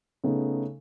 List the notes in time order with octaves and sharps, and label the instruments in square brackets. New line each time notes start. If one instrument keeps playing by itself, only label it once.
[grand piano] C#3 A3 B3 D#4